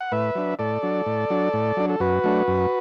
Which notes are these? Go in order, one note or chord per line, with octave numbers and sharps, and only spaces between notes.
F#5
A2 B4 E5
F#3 D4
A2 A4 D5
F#3 D4
A2
F#3 D4
A2
F#3 D4
A4
F#2 F#4 B4
F#3 A3 D4
F#2